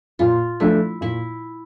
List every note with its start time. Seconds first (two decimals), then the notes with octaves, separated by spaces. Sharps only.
0.19 A#2 F4
0.60 F3 A3 D4 E4
1.01 A#2 E4